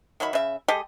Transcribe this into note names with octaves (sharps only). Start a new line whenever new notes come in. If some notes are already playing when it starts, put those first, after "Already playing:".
D#3 F#3 E5 B5
C#3 E5
G#3 G4 A4 D#5